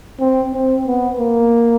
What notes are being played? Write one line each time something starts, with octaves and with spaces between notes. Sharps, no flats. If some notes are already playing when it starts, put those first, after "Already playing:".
C4
C4
B3
A#3